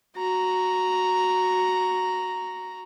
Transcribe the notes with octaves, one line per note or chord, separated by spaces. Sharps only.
F#4 A#5